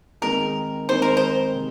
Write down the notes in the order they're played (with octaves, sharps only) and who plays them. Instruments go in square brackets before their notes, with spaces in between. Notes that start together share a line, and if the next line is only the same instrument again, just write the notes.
[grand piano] D#3 G#3 C4 D#4 G#4 [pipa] A#4
[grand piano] D#3 G#3 C4 D#4 G#4 [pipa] C5
[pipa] A#4
C5
[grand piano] C3